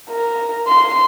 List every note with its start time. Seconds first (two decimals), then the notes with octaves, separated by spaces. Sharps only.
0.11 A#4
0.68 C6